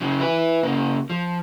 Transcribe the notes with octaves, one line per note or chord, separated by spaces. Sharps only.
C#3 F#3
E4 B4
C#3 A#3
F3